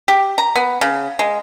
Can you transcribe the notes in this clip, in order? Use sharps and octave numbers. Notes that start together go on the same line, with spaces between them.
G4
A#5
B3
C#3
G#3